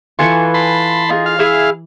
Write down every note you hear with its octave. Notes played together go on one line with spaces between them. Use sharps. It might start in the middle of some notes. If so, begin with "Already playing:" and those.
E3 F4 A4 B4 G#5 C#6
A5 B5 C6
D#4 F4 G#4
F5
E4 G#4 E5